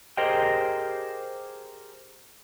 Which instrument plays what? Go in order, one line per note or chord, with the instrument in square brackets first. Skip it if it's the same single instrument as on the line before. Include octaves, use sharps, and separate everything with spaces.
[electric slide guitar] G4 G#4 A#4 C5 D#5 G5